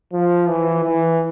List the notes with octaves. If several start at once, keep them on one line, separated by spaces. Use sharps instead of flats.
F3
E3
E3